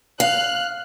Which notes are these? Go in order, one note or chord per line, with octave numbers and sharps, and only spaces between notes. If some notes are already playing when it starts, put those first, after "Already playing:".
F5 F#6